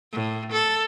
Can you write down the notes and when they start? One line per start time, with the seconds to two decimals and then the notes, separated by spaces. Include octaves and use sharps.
0.13 A2
0.52 A4